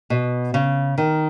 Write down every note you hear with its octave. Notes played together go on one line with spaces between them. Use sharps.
B2
C#3
D#3